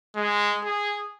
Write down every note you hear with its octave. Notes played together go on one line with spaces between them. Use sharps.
G#3
G#4